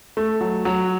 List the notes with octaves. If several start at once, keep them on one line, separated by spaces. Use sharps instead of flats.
A3
F#3
F#3